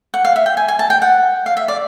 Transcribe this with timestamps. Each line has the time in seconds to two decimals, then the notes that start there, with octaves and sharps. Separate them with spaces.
0.14 F#5
0.25 F5
0.36 E5
0.46 G5
0.57 G#5
0.68 G#5
0.79 A5
0.90 G5
1.02 F#5
1.46 F5
1.57 E5
1.68 D5